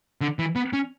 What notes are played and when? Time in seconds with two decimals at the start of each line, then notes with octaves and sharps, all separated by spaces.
0.21 D3
0.39 E3
0.56 B3
0.73 C#4